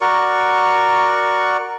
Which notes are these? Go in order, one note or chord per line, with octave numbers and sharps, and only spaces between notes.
F#4 A#4 D5 C#6